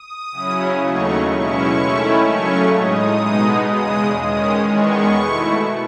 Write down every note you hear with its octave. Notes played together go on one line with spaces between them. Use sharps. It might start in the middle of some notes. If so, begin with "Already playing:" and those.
Already playing: D#6
C#3 F#3 C#4 E4
D#2 C#3 F#3 A3 D#4 C#6
B2 G#3 C#4 E4 C#6
D#3 A3 C#4 E4
C#3 F#3 A3 C#4 C#6
A2 G#3 D#4 D#6
B2 G#3 B3 D#4
E2 C#3 G#3 D#6
D#3 G#3 C#4 D#6
E2 D#3 G#3 B3 C#6
B2 A3 E4